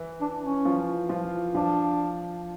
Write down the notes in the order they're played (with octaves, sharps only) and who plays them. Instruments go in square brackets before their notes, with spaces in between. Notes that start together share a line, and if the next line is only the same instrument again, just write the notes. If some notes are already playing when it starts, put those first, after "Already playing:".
Already playing: [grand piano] E3 E4
[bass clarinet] D4
C#4
[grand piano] F3 F4
F3 F4
[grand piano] F3 F4 [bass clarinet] D4